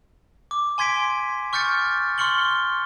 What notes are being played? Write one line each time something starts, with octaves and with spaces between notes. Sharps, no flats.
D6
G#5 C6 G#6 B6 D7
C#6 F6 G6 A6 C#7
C6 C#6 F6 C#7 F#7 G7